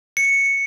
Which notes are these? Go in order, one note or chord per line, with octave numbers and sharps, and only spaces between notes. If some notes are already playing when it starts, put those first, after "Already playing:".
C#7